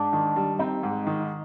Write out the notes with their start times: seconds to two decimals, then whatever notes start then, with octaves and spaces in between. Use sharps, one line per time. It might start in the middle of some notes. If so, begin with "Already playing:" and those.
Already playing: G#2 D4
0.13 D#3
0.36 G3
0.59 C4 D#4
0.83 G#2
1.07 D#3